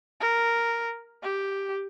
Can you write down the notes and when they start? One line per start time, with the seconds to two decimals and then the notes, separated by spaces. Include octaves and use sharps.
0.21 A#4
1.23 G4